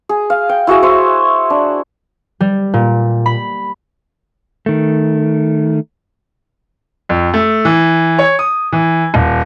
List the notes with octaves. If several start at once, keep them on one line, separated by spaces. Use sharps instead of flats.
G#4
F5
G5
E4 F#4 G#4 E5
E4 C5 C#5
D4
G3
A#2
B5
D#3 A3
F2
A3
E3
C#5
D#6
E3
D#1